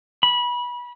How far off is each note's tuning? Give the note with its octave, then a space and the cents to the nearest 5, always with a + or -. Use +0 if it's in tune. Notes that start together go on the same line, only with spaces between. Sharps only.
B5 -25